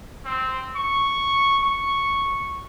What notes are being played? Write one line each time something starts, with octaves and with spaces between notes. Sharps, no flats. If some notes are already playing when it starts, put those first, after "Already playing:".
C4
C#6
C#6